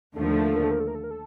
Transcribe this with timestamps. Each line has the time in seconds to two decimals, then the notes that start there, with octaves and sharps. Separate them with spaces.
0.16 D#2 D3 F3 A3 A4
0.24 A#4
0.32 A4
0.40 A#4
0.48 A4
0.56 A#4
0.64 A4
0.71 A#4
0.80 A4
0.87 A#4
0.95 A4
1.04 A#4
1.11 A4